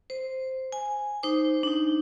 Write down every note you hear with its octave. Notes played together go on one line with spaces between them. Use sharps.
C5
G#5
D#4 C5 D6
D4 D#4